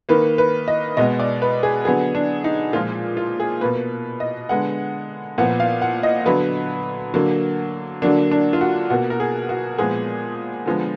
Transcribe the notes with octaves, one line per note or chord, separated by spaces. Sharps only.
D#3 A#3 B4
B4
D#5
B2 G#3 B3 D#5
D5
B4
G#4
D3 F#3 B3 G#4
D4
D#4
A#2 F3 G#3 F4
F4
G#4
B2 A#3 B4
D#5
D3 G#3 B3 F#5
A#2 F3 B3 F#5
F5
F#5
D#5
D3 F#3 B3 B4
D3 F#3 A#3
D3 F#3 A#3 D4
D4
F4
F#4
B2 A#3 F#4
A#4
G#4
F#4
A#2 F3 G#3 B3 G#4
D3 F3 G#3 B3